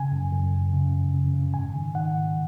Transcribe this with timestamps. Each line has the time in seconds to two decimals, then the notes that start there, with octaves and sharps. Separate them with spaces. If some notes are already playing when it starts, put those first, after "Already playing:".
Already playing: C#3 G#5
0.12 F#2
0.32 F#2
0.53 F#2
0.73 C#3
0.93 F2
1.14 C#3
1.34 C#3
1.54 G#2 G#5
1.75 D#3
1.95 D#3 F#5
2.16 G#2